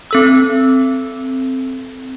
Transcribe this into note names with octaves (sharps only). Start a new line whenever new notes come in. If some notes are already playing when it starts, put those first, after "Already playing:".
C4 A4 E6